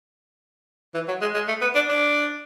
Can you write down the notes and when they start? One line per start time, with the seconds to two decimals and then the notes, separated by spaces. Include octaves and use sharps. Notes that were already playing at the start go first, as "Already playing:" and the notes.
0.94 E3
1.08 F#3
1.21 G#3
1.34 G#3
1.48 A3
1.61 B3
1.75 D4
1.89 D4